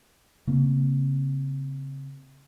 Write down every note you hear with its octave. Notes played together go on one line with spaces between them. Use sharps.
C#3 A#3 C4